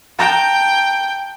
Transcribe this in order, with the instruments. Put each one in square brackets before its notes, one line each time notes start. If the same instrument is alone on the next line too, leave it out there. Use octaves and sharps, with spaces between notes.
[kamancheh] G5 [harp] A5 A#5 G6